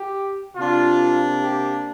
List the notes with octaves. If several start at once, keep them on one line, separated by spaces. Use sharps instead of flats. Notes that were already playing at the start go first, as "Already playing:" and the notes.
Already playing: G4
C3 A#3 D4 F4
G4